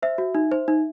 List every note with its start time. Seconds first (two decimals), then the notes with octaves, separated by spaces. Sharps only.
0.02 C5 E5
0.18 F#4
0.35 D#4
0.52 C5
0.68 D#4